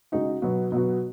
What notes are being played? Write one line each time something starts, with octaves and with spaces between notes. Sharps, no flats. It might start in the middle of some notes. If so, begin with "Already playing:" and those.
C#3 G#3 D#4 F#4
B2 F#3 B3 F#4
B2 F#3 B3 F#4